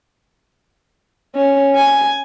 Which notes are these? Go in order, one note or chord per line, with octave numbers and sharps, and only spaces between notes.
C#4
G#5